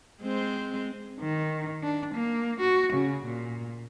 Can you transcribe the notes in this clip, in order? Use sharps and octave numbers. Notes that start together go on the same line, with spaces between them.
G#3 C4 C5
D#3
D4
A#3
F#4
C#3
A#2